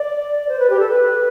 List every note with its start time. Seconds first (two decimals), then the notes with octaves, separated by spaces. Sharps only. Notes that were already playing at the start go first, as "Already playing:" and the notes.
Already playing: D5
0.49 C5
0.59 B4
0.70 G4
0.79 A4
0.90 B4